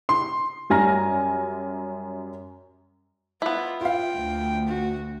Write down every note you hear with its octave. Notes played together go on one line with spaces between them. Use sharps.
C6
F#2 G3 G#5 A#5 F6 A#6
B3 E4 F4
F4 F5 G5
D2
F#4